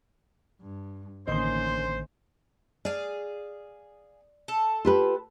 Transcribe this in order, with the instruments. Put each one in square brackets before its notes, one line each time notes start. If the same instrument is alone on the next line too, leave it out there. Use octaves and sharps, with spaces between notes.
[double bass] G2
[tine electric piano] A1 C6 [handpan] D3 D#3 D#5 [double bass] A#3 C#4 [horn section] C5
[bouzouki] G#4 F5 [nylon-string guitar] D5
[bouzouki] A4
[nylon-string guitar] F4 G4 B4